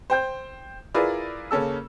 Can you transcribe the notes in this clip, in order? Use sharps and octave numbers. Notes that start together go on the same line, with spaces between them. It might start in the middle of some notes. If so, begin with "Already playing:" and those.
C5 G5 G6
E4 F4 G#4 A#4 B4 D5
C#3 A#3 C#4 A4 E6